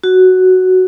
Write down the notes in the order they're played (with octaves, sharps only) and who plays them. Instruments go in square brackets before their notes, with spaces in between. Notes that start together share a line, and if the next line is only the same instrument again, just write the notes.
[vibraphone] F#4